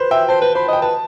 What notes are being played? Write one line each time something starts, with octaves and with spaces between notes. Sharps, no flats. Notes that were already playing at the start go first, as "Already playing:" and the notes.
Already playing: B4 C5
E5 G5
C5 A5
B4
C5 B5
D#5
G5
B4 A5